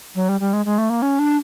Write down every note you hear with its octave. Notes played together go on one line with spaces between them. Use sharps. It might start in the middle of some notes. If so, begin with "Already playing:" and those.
F#3
G3
G3
G#3
G#3
A3
A#3
C#4
D4